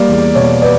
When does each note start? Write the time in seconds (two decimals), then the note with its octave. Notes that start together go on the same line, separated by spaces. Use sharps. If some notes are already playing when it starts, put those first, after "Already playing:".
Already playing: G3 A#3 D5
0.09 E2
0.35 B2 C#5
0.62 B3 D5